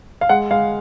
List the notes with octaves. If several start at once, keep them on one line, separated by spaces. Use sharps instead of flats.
F5
G#3 F#5
G#3 F5